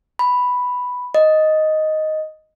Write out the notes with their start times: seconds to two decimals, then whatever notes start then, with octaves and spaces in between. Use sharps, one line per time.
0.19 B5
1.15 D#5